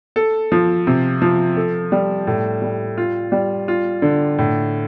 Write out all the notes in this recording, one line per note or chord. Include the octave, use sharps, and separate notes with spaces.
A4
F3
C3
F3
A4
G3
A2
G3
F4
G3
F4
D3
A2